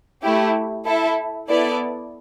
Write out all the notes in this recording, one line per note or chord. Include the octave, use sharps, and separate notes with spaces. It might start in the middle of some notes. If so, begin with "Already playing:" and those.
A3 E4 G4
E4 A4 E5
B3 E4 A4 D5